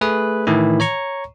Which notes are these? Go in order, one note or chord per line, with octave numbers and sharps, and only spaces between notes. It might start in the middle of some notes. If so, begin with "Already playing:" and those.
A3 G#4 B4
A2 D#3 E3 E4
C#5 A#5 C#6